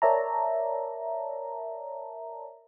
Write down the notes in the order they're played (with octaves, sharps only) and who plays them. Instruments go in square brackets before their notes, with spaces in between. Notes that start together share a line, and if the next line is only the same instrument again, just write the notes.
[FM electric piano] A#4 C#5 D5 E5 A5 A#5